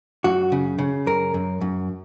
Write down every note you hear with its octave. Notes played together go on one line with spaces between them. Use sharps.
F#2 F#4
C#3
C#3
F#2 A#4
F#2
F#2